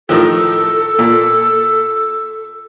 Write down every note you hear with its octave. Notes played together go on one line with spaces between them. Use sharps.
A2 D#3 F3 A4 E6
A#2